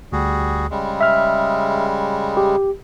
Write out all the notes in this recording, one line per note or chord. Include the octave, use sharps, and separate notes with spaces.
D2 G3 F#4 G#4
C#3 G3 G#3
E5 F6
G4